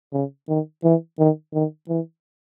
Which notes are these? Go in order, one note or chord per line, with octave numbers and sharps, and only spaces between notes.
C#3
D#3
E3
D#3
D#3
E3